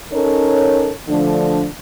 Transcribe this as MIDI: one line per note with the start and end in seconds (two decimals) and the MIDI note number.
0.12 0.91 61
0.12 0.91 63
0.12 0.91 69
0.12 0.91 70
0.12 0.91 73
1.09 1.67 50
1.09 1.67 53
1.09 1.67 57
1.09 1.67 62